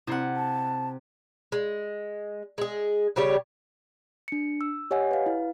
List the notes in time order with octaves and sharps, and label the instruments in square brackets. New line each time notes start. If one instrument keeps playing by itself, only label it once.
[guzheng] C3 F#5 [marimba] C4 E4
[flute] A5
[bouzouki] G#3
G#3 G#4
C#3 G3 G4 C#5
[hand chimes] D4 C#7
E6
G4 C#5 D#5 F#5 G#5
B4 F5
E4